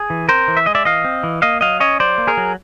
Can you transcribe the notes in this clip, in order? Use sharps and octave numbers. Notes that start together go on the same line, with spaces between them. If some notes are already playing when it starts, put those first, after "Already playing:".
Already playing: G#4
E3
C4 A#4 C5
E3
E5
G#3 D#5
D5 E5
E3 D#5 F5
C4
E3
A#3 D#5 F5
F#3 D#5 F5
C#4 C#5 D#5
F#3 C5 D5
A#3
G#4 A#4
F#3